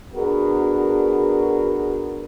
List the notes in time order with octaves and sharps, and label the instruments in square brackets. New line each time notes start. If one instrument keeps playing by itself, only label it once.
[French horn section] B3 D4 F#4 G#4 A#4